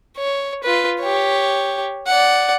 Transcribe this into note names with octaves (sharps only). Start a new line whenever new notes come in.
C#5
F4 B4
G4 C#5
D5 F#5